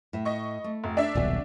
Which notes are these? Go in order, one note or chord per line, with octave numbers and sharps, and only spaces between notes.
A2 E5
D#5 C#6
A3
F1
D4 E5
D#1 B1 C3 F#3 G#5